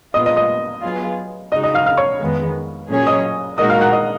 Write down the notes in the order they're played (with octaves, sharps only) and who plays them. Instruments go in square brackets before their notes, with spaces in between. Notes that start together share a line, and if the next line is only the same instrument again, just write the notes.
[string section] A#2 G#3 B3 F4 [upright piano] D#5 D#6
[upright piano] D#5 D#6
D#5 D#6
[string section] F#3 B3 F4 G#4
[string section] C#3 G#3 D#4 F#4 [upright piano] D#5 D#6
[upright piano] D#5 D#6
F5 F6
F5 F6
C#5 C#6
[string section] F2 D#3 G#3 B3
A#2 F#3 C#4 G#4 C#5
[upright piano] D#5 D#6
[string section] A#2 G#3 D#4 F#4 A#4 [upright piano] D#5 D#6
[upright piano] F5 F6
F#5 F#6
D#5 D#6